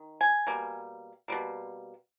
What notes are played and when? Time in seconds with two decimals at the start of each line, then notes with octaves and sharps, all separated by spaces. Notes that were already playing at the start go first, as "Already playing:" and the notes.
Already playing: D#3
0.21 G#5
0.47 B2 G3 A#3
1.28 B2 G3 A#3